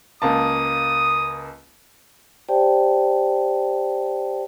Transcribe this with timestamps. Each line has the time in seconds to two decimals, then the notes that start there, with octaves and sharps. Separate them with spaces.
0.22 C#2 A#3 A5 D#6
2.49 G4 C5 D5 G5 A5